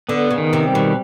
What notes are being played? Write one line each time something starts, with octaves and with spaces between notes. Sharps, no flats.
D3 B3
C#3
D#3
C3
G3
B2